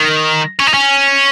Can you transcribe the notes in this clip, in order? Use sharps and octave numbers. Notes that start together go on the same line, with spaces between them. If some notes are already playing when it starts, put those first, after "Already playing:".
Already playing: D#3
C#4
D#4
C#4